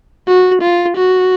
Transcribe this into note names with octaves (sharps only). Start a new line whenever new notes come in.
F#4
F4
F#4